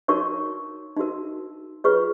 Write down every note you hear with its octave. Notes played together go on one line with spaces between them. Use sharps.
D#4 F#4 A#4 C#5 C#6
D#4 F#4 A#4
F4 G#4 B4 C#5 C#6